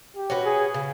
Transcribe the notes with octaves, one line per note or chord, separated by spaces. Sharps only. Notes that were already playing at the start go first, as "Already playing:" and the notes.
G4
C#4 F#4 B4
G#4
C#3